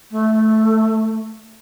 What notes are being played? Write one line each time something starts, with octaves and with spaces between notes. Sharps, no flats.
A3